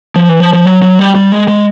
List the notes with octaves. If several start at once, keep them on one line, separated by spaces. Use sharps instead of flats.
F3
E3
F3
F3
F#3
F#3
G3
G3
G#3
G#3